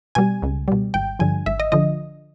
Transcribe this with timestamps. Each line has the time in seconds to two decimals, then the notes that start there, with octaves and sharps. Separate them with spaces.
0.15 B2 G3 G#5
0.42 C#2
0.68 B2 G3
0.94 G#1 G5
1.19 G2 D3 F3 G#5
1.46 G#1 E5
1.60 D#5
1.72 D3 F3 D#5